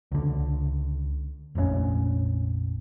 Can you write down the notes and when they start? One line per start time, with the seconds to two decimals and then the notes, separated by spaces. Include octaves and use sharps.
0.12 C#2 D3
1.55 F1 A#1 C3 C#4